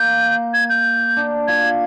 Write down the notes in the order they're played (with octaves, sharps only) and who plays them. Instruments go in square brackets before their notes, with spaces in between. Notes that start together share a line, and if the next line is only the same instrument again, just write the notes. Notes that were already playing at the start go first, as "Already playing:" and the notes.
Already playing: [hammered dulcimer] A#3 [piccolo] G6
[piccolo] G#6
G6
[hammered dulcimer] D4
[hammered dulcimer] F4 [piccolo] G#6